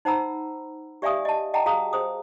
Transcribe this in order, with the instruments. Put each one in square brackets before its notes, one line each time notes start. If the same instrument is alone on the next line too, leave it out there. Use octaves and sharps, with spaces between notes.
[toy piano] D#4 C5 F#5 A#5 B5 E6
G4 D5 E5 F5 G#5 D#6
D#5 A5
D#5 F#5 G5 A5 A#5
F#4 G#4 F5 A#5 D#6
G#4 C5 D#6